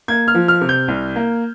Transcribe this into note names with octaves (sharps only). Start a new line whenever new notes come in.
A#3 G#6
F6
F3
F6
C3
G6
C2
A#3